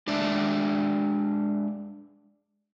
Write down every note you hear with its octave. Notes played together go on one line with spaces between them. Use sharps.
G#3 D4 D5 E5